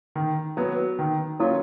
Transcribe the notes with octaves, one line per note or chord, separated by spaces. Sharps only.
D#3
F#3 B3
D#3
F#3 A#3 C#4 F4